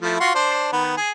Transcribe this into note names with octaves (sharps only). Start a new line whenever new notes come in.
F3 A3 E4
F4 F#4 C6
D4 C5 C6
D#3 B3
G#4